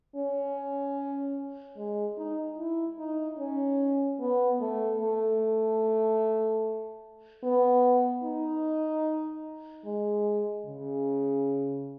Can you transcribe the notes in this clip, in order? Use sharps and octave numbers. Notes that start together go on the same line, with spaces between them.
C#4
G#3
D#4
E4
D#4
C#4
B3
A3
A3
B3
D#4
G#3
C#3